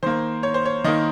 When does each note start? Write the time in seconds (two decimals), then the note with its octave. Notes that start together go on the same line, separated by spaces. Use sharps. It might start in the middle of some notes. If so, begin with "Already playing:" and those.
0.03 D#3 A#3 C5
0.43 C#5
0.54 C5
0.65 C#5
0.84 D#3 A#3 D#5